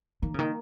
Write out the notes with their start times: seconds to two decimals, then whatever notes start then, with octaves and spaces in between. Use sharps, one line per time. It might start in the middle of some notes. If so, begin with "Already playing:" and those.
0.22 D#3 A#3
0.34 C#3
0.39 D#3 A#3